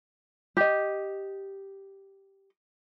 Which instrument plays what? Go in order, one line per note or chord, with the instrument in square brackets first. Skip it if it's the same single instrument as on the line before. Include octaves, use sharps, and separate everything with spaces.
[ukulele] G4 D#5